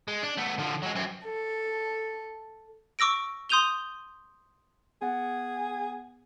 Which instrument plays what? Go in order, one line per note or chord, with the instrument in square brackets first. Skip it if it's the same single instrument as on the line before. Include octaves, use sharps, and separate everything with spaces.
[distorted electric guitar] G#3
D4
A3 B3
D3 F3
F#3 G#3
F#2 C4
[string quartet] A4
[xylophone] C#6 D6 E6 A#6 D7
C6 D#6 G6 D#7 F7 G7
[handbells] B3 F#5 A6 [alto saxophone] G#4